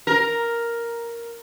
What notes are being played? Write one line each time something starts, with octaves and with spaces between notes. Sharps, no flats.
A#4